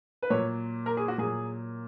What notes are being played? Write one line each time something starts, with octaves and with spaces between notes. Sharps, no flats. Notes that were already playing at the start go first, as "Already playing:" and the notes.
B4
A#2 F#3 C#5
A#4
G#4
F#4
A#2 F#3 G#4